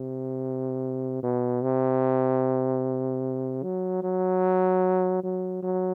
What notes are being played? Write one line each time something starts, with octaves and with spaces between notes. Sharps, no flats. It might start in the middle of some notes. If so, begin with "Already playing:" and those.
Already playing: C3
B2
C3
F#3
F#3
F#3
F#3